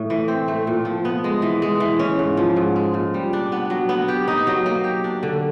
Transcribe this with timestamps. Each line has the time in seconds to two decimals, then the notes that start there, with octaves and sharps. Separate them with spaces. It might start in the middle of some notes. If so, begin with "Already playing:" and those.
Already playing: A2
0.10 E3
0.28 C4
0.48 A3
0.67 A#2
0.85 F3
1.05 B3
1.24 G#3
1.42 E3
1.62 G#3
1.80 E3
1.99 C#4
2.19 G#2
2.37 F3
2.56 G#2
2.76 G#3
2.94 A#2
3.14 G3
3.33 D4
3.52 B3
3.70 F#3
3.89 B3
4.08 G4
4.28 D#4
4.47 F#3
4.66 A#3
4.84 G4
5.04 D4
5.23 D3